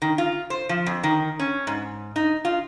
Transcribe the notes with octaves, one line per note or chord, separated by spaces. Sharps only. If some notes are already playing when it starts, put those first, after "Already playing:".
D#3
F4
C5
F3
F2
D#3
C#4
G#2
D#4
F4